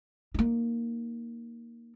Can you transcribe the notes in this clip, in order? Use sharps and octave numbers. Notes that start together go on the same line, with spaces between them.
A#3 D#4